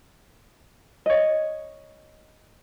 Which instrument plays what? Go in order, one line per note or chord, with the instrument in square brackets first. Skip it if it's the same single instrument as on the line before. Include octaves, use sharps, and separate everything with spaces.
[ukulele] C#5 D#5